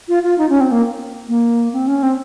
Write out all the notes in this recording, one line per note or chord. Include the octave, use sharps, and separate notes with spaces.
F4
F4
D#4
C#4
C4
A#3
A#3
C4
C#4
C4